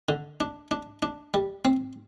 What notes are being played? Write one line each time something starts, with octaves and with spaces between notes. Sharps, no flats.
D3
D4
D4
D4
G3
C4